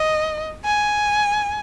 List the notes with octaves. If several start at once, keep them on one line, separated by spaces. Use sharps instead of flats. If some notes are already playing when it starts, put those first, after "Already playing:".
Already playing: D#5
G#5